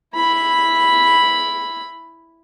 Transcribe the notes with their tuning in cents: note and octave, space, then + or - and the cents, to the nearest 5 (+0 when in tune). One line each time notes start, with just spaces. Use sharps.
E4 +0 B5 +0